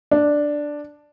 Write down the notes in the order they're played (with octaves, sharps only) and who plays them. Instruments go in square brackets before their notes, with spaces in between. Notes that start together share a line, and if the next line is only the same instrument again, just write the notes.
[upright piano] D4